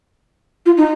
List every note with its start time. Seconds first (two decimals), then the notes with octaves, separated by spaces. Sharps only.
0.66 F4
0.77 D#4